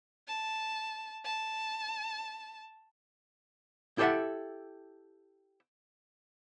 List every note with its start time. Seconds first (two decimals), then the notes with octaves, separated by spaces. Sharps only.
0.28 A5
1.25 A5
3.98 E4 G4 A4 C5 E5 F#5